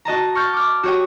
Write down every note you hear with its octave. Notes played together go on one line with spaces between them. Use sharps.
F#4 D#5 A5 A#5
C#6 F6 G6 A6
D6 F6
F#4 G4 C#5 G5 D#6